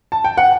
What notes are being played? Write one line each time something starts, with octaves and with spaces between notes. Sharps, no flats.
A5
G5
F#5